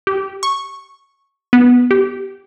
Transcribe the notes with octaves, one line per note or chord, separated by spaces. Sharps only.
G4
C#6
B3
G4